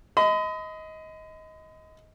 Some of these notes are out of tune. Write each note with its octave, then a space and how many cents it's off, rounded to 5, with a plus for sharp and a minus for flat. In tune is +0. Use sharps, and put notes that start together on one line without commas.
D#5 +20 B5 +45